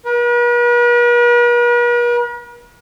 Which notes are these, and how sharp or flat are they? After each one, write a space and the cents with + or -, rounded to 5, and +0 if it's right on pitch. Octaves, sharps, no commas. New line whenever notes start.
B4 -45